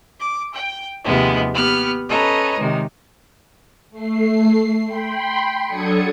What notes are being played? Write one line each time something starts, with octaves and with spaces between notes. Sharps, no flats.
D6
G5
D#2 C3 D#3 F3 G#3 B3
B3 G4 F6 F#6
C#4 A4 B4 C#5 D#5 A#5
C3 D#3 G#3
A3 C7
G5 B5 C6
F#3 D4 A4 D#6 G#6 C#7